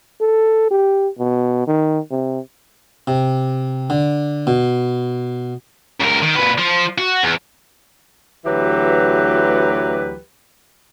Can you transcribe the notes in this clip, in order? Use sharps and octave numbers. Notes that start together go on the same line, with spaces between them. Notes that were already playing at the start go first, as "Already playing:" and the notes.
A4
G4
B2
D#3
C3
C3
D3
B2
C#2 A#4
D#3
A#2 B4
F3
F#4
E2
D2 E3 F#3 G4 B4